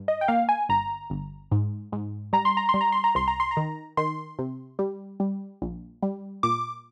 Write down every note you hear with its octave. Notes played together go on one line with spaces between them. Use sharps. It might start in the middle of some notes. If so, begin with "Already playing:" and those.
Already playing: G2
D#5
G5
A#3 F5
G#5
G1 A#5
G1
G#2
G#2
G3 A#5
C6
A#5
C6
G3
A#5
C6
A#5
C2 C6
A#5
C6
A#5
D#3
D#3 C6
C3
G3
G3
A#1
G3
A#2 D6